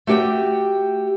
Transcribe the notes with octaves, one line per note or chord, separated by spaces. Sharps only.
A3 F#4 G4 G5